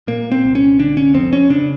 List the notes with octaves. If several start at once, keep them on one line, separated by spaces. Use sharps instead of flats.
A#2 A#3
C4
C2
C#4
D3 D4
C#4
F2 C4
C#4
C#3 D4